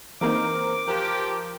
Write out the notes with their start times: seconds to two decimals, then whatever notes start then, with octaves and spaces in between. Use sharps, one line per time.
0.21 E3 A#3 C4 D#4 A#4 C5 D6
0.88 F3 G4 A#4 F#6